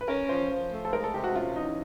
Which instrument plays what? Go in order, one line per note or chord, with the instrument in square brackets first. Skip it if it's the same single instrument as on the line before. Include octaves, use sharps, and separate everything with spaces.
[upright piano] B4
[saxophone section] C#4 [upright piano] A#4
[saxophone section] F3 [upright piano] C5
[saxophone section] F3
A3
[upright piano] A4
[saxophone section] G#3 [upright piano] A#4
[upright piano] A4
[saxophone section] C3 [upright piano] G4
[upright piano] F#4
[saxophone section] C#4 [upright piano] F4
[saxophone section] E3 [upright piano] D#4